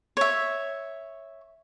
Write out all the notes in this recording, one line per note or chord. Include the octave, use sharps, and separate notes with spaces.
C#5 E5